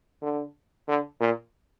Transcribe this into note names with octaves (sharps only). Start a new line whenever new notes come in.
D3
D3
A#2